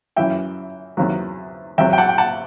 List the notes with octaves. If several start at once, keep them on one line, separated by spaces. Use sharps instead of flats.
F#2 E3 E5 G5
E2 C3 D#3 F#3
E2 C3 F#3 E5 G5
G5
F#5 A5
G5
F#5 A5